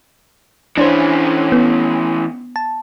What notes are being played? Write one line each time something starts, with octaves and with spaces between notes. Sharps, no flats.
E3 C#4 D4 C5
B3
A5